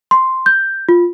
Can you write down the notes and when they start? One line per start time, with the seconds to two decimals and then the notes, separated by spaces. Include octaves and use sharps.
0.11 C6
0.46 G6
0.89 F4